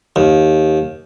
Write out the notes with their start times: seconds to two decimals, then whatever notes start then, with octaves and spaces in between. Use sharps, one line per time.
0.16 D#2